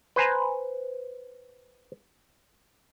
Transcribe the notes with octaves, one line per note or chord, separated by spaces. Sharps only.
B4 C5 G#5 A#5